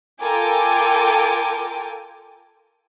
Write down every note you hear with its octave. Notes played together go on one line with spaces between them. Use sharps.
F4 A4 A#4 G5 G#5 D6